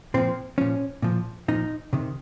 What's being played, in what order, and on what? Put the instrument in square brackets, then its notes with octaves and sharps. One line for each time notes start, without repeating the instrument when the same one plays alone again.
[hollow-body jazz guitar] A#2 F3 C4
A#2 F3 C#4
A#2 F3
A#2 F3 D#4
C3 D#3